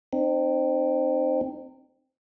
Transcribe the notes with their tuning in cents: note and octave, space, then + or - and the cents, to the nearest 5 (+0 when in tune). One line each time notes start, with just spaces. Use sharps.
C4 +0 D#4 -40